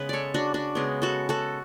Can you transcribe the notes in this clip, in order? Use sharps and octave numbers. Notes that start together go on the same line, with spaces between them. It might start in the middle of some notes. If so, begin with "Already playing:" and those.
Already playing: C#3 G#3 B3 B4
A4 C#5 D5
D4 F#4
D4 F#4
C#3 G#3 B3
F#4 A4
F#4 A4